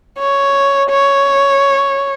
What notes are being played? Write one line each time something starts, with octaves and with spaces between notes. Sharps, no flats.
C#5
C#5